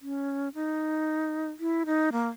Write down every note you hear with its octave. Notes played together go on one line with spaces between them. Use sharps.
C#4
D#4
E4
D#4
A#3